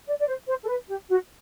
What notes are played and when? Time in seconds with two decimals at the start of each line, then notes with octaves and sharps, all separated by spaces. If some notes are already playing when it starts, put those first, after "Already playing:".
0.07 D5
0.19 D5
0.27 C5
0.48 C5
0.63 A4
0.68 B4
0.89 G4
1.10 F#4